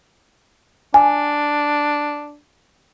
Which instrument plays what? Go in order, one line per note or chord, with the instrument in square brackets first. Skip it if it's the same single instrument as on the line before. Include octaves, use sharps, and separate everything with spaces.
[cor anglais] D4 [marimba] G#5